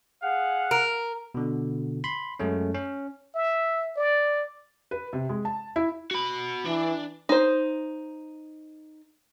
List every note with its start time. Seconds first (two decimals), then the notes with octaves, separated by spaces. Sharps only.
0.23 G#4 F5 F#5
0.71 A#4
1.35 B2 D3
2.04 B5 C6
2.40 F#2 G#3 A3 C#4
2.74 C#4
3.35 E5
3.96 D5
4.91 B4
5.13 C3
5.29 G#3
5.45 A5
5.76 E4
6.11 F#4 B5
6.66 E3 D4
7.29 D#4 C5